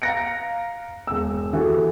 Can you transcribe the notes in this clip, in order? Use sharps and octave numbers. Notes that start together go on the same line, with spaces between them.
F5 A#5 F#6 A#6 C#7 D7
E1 E6
E3 F#4 G4 A4